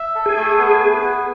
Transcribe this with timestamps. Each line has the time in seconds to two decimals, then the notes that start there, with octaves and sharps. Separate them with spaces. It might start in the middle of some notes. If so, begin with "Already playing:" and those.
Already playing: E5
0.15 A4
0.26 G#4
0.37 A3
0.59 B3
0.80 B4
1.02 B3